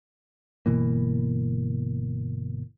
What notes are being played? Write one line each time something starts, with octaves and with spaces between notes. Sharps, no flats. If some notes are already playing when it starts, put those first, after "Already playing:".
G1 B2 E3 A#3